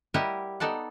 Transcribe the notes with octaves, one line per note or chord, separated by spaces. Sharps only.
G3 E4 G4 A#4 D#5 F#5
B3 D#4 A4 D5 F#5